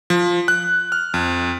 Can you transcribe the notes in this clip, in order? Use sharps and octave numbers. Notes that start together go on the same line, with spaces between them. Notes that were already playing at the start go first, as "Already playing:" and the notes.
F3
F#6
F6
F2